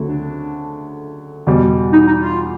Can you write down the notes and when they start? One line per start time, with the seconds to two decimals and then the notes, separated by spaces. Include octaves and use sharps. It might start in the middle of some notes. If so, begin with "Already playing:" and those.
Already playing: D2 C#3 F#3 A3 C4
0.08 D4
1.47 E2 B2 G3
1.92 D#4
2.07 D#4
2.23 F4